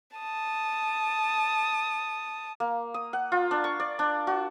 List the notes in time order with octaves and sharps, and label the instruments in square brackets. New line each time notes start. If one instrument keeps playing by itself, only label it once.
[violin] A5 D#6
[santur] A#3
D#6
F#5
F4
D4
C#6
D5
D4
F#4